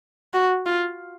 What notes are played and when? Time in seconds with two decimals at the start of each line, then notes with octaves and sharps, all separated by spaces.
0.34 F#4
0.66 F4